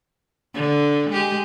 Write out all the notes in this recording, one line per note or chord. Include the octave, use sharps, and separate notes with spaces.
D3
G#3 G4